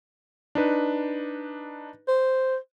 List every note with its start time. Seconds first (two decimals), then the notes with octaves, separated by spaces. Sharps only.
0.55 D4 D#4 B4
2.08 C5